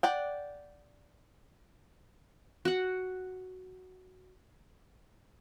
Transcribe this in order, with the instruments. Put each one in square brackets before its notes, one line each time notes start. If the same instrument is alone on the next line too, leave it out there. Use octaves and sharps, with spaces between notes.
[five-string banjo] D5 F#5 G5
[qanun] F#4 F#5